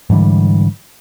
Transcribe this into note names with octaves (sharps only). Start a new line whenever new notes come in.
G#2 D3 E3 G3